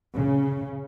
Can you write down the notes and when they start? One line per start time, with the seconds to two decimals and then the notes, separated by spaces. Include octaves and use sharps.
0.16 C#3